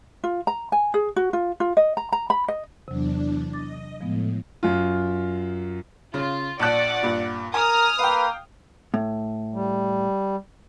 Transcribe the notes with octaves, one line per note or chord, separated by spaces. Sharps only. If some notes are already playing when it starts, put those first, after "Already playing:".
F4
A#5
G#5
G#4
F#4
F4
F4
D#5
A#5
A#5
B5
D#5
E2 C3 F#3 D4
D#5 D6 A6
A2 F3 G#3 B3
F#2 F4
C#3 F4
A#1 D5 F#5 A5 F#6
G2 A#2
A#4 G#5 D#6 F6
A#3 B4 F5 G5
A2
G3